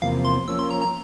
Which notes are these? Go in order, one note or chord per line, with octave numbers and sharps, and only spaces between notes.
E2 C3 F3 A#3 F5
C6
F3 A#3 C#4 E6
C6
A#5
A#5